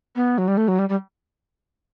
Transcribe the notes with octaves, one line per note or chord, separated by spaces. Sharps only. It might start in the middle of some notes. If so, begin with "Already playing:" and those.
B3
F#3
G3
A3
F#3
G3
G3